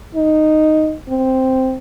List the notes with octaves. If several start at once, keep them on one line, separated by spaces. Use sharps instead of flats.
D#4
C4